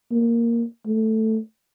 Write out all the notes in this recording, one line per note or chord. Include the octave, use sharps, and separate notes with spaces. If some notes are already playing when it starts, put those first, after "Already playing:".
A#3
A3